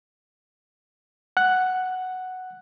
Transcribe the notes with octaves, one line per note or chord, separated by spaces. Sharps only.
F#5 F#6